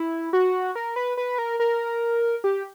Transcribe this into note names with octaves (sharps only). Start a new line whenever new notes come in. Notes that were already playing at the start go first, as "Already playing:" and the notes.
Already playing: E4
F#4
A#4
B4
B4
A#4
A#4
G4